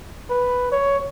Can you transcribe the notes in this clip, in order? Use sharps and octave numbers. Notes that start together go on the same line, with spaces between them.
B4
C#5